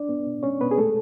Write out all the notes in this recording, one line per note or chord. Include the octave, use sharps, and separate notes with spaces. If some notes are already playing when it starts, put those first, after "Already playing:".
Already playing: D4 D5
B3
B2
G#3 C#4 C#5
B2 B3 B4
G#4
G#3 A3 A4